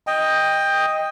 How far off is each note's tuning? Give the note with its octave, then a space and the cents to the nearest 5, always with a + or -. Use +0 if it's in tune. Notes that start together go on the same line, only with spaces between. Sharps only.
D#5 +0 G5 +15